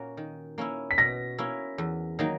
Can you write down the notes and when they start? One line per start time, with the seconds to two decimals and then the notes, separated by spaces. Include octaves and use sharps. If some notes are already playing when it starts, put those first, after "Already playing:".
Already playing: A#2 A#3 C#4 F#4
0.17 D#3
0.58 A#3 C#4 E4
0.91 B6
0.98 B2 A#6
1.38 A#3 C#4 E4
1.78 E2
2.19 D#3 F#3 A#3 D#4